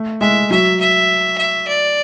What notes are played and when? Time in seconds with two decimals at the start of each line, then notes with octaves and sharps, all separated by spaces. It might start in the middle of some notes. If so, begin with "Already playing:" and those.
Already playing: A3
0.21 G#3 E5
0.51 F#3 E5
0.80 E5
1.38 E5
1.68 D5